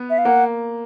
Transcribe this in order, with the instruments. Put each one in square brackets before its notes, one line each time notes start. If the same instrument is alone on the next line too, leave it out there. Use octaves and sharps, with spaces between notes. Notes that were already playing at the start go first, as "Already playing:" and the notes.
Already playing: [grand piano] B3
[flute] E5
F5
[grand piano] A#3 [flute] F#5